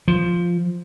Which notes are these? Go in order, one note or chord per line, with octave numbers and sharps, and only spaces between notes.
F3